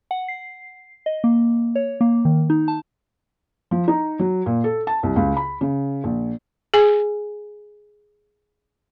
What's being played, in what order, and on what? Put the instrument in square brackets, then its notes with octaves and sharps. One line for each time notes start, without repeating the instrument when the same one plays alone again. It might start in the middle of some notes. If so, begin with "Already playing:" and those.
[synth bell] F#5
C7
D#5
A#3
C#5
A#3
D#3
D#4
A5
[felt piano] F3
D#4
F#3
A#2
A4
A5
C2
C#2
B5
C#3
A#1
[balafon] G#4 G#5